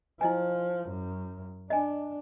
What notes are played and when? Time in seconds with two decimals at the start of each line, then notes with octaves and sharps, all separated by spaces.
0.21 F3 E4 D#5 G#5
0.89 F#2
1.70 D4 D#5 G#5